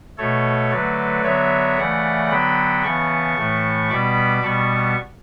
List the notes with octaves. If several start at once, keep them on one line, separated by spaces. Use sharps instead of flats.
B2 A3 A4 C#5
D3 F#3 A3 B4 D5
D3 F#3 B3 C#5 E5
C#3 E3 A3 D5 F#5
D3 F#3 B3 G5 B5
C#3 E3 B3 A5 C#6
A2 E3 A3
B2 G3 B3 B5 D6
B2 G3 B3 A5 C#6